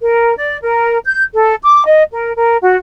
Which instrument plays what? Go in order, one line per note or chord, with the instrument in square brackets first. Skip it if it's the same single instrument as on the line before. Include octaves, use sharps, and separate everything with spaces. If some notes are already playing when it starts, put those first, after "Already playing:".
[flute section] A#4
D5
A#4
G6
A4
D6
D#5
A#4
A#4
F#4